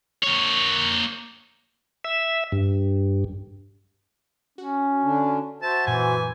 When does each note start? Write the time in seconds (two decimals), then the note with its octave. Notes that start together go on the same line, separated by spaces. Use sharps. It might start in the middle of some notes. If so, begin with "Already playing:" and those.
0.24 A#3 C#5
2.04 E5
2.52 G2
4.58 C#4 F#4
5.03 D3 D4
5.62 F#4 C5 E5 A5
5.87 F#2 A#2 E3 G#5